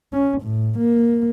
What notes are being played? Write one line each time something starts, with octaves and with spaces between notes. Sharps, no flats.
C#4
A2
A#3